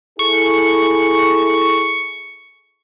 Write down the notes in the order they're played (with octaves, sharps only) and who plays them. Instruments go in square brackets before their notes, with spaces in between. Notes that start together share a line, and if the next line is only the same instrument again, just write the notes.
[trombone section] E4 G#4 A4 [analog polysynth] C#6